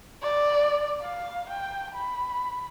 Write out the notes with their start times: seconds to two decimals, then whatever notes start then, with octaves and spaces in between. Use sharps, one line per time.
0.22 D5
1.01 F5
1.49 G5
1.95 B5